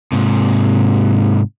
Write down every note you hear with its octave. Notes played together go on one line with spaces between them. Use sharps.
G#2 C3